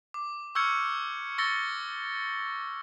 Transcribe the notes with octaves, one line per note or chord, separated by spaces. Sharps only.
D6
C#6 E6 F6 G6 G#6 C#7
C#6 E6 A6 A#6 C#7 G7